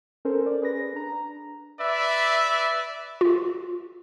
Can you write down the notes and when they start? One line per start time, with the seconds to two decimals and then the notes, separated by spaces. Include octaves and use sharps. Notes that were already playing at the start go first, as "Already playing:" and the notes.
0.25 C#4 A4 A#4 C5
0.46 D5
0.62 G#4 B4 A#6
0.94 D4 A#5
1.81 B4 D5 E5
3.21 F4